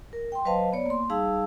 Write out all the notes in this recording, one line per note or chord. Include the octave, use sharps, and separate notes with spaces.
A#4
G5 C6
F#3 B4 C5 D#5 F5 A5
B3 C#5 D5
A#3 C6
G3 D#4 G#4 F5 A5 E6